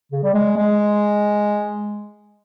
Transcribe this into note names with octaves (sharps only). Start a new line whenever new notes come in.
C#3
G3
G#3
G#3